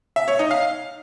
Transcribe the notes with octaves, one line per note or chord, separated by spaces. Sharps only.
E5
C#5
D#4
F5